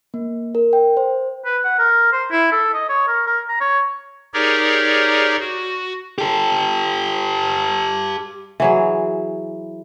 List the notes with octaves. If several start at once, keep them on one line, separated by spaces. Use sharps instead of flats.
A#3
A#4
G5
C5
B4
F#5
A#4
C5
E4
A4
D#5
C#5
A#4
A#4
A#5
C#5
D#4 G4 G#4 A#4 C#5 D5
F#4
G4 A4
E3 F#3 G#4